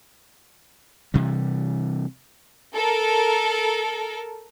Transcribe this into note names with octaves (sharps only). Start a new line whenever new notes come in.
C3 E3 G3
A4 A#4